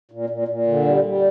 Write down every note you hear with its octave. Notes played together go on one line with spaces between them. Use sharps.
A#2
A#2
A#2
D3
G3
G3